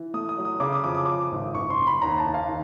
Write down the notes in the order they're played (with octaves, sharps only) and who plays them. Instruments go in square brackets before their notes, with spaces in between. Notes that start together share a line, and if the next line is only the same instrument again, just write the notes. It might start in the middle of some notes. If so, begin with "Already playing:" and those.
Already playing: [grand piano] E3
A3 D#6
D#6
F#3
D#6
C#3 D6
D#6
F2 D6
D#6
F3 D6
G#1
F#1 C#6
C6
F#1
B5
D#2 A#5
A5
D#2
F5
D#3